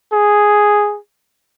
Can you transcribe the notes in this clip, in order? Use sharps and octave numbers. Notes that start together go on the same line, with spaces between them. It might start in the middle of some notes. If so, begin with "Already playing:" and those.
G#4